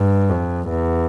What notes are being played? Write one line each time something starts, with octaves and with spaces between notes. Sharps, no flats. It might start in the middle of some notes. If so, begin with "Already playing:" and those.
Already playing: G2
F2
E2